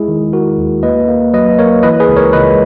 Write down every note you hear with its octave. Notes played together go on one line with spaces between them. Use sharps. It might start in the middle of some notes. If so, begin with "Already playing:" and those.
Already playing: G#3 E4 G#4
D#3
G#3 F#4 A#4
D#2
A#3 B4 D#5
A#3
F#3 B4 D#5
A#3 A#4 C#5
E3 B4 D#5
G#4 B4
C#2
A#4 C#5
C#2 B4 D#5